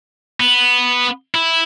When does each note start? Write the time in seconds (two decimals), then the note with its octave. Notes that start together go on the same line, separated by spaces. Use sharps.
0.40 B3
1.35 E4